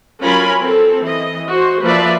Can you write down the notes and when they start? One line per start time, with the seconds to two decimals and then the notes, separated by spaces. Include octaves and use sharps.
0.22 F#3 C#4 F4 A#4 G#5 B5
0.61 C4 A4
1.03 E3 D#5
1.49 F#4 C5
1.83 F3 A#3 B4 D5 E5